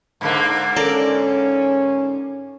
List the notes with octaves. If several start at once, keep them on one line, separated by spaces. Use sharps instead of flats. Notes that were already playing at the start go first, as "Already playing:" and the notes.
G#2 D3 A#3
C#4 A4 A#4 D5